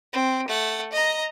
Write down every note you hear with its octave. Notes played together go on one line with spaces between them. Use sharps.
C4
A3 F#5
D#5 A#5